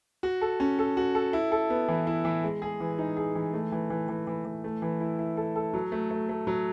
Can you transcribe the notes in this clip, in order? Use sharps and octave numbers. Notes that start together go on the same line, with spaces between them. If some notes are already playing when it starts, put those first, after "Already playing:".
F#4
A4
C#4
A4
F#4
A4
E4
A4
B3
E3
E4
E3
G#3
G#4
E3
D#4
G#4
E3
A3
E3
E3
E3
E3
E3
A3
E3
E4
E4
A4
A4
F#3
A3
A3
A3
F#3